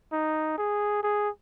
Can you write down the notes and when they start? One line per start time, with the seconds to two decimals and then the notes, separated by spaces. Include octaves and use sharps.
0.12 D#4
0.58 G#4
1.03 G#4